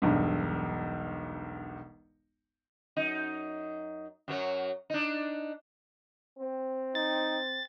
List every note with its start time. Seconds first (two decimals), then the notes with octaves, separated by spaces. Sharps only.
0.02 E1 B1 G2
2.97 F#2 D#4
4.28 F#2 F#3 C#5
4.90 D4 D#4
6.39 C4
6.95 D#4 A6